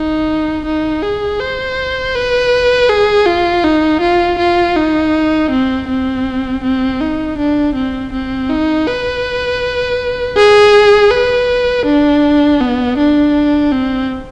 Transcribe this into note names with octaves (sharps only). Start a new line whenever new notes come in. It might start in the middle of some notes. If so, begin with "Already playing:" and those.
Already playing: D#4
D#4
G#4
C5
B4
G#4
F4
D#4
F4
F4
D#4
C4
C4
C4
D#4
D4
C4
C4
D#4
B4
G#4
B4
D4
B3
D4
C4